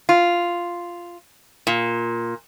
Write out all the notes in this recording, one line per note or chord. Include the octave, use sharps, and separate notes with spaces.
F4
A#2